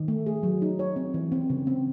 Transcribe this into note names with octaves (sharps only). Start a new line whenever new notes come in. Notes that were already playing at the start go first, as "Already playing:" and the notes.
Already playing: D#3
A3
G#4
F#3
D#4
C#5
C4
E3
C4
C#3
C4